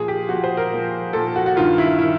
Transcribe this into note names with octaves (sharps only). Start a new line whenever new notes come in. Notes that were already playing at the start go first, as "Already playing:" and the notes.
Already playing: A#2 F3 G#4
G4
A#2 F3 F#4
C5
A#4
A#2 F3
A#2 F3 A4
F#4
F#4
G2 D#3 F4
E4
D#3 E4